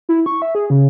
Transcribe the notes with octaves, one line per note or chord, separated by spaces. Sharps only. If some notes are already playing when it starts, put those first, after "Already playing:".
E4
C#6
E5
G#4
C#3